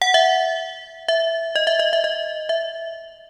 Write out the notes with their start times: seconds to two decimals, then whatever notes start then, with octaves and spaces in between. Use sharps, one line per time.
0.02 F#5
0.14 E5
1.08 E5
1.55 D#5
1.67 E5
1.79 D#5
1.93 E5
2.04 D#5
2.49 E5